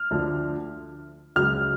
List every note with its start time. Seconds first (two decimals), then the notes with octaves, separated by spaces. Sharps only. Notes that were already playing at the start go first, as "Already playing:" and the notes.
Already playing: F6
0.11 D2 D3 F3
1.36 C#2 C#3 F#3 F6